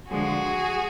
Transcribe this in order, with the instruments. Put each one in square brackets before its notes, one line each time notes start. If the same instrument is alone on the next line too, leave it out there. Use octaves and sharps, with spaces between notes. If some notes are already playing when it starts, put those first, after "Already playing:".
[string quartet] D3 F3 G#3 F#4 G#4